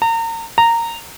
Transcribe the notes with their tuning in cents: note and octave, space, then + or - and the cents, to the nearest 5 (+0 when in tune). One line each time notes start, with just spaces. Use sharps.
A#5 -35
A#5 -15